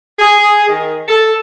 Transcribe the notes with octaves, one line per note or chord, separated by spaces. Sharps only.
G#4
D#3
A4